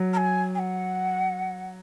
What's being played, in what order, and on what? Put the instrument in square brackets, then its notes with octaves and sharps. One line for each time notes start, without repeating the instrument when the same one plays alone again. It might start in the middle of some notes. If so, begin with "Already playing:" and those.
Already playing: [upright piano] F#3
[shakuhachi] A#5
G#5
G#5
F#5